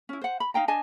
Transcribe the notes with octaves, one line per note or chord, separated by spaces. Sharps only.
C#4 E4
C5 F#5
B5
D#4 F5 G5 A#5
D4 D#5 G#5 A5